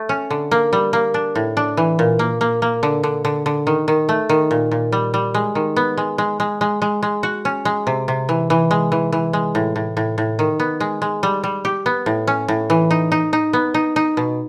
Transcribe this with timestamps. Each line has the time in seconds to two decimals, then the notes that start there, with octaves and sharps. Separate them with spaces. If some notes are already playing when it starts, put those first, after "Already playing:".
Already playing: A3
0.09 C#4
0.30 D3
0.51 A#3
0.73 G3
0.93 A#3
1.14 D4
1.35 A2
1.57 D4
1.77 E3
1.99 A#2
2.19 A#3
2.41 A#3
2.62 A#3
2.83 D3
3.03 D3
3.25 D3
3.46 D3
3.67 D#3
3.88 D#3
4.09 A3
4.29 D#3
4.51 A#2
4.71 A#2
4.92 G3
5.14 G3
5.34 G#3
5.55 D#3
5.76 B3
5.97 G#3
6.18 G#3
6.40 G#3
6.61 G#3
6.82 G#3
7.03 G#3
7.23 F#4
7.45 C#4
7.65 G#3
7.87 C3
8.08 C3
8.29 E3
8.50 E3
8.71 G#3
8.92 E3
9.12 E3
9.33 G#3
9.55 A2
9.76 A2
9.97 A2
10.18 A2
10.39 D#3
10.60 B3
10.80 G#3
11.02 G#3
11.23 G3
11.44 G3
11.65 G4
11.86 B3
12.06 A2
12.27 C#4
12.48 A2
12.70 E3
12.91 D#4
13.12 D#4
13.33 D#4
13.53 B3
13.74 D#4
13.96 D#4
14.17 B2